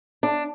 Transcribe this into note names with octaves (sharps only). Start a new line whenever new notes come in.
D4